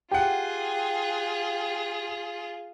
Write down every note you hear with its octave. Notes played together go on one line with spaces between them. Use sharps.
F4 G4 G#4 F#5